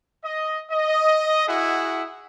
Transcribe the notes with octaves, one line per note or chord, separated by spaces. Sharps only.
D#5
D#5
E4 F#4 G#4 E5 F#5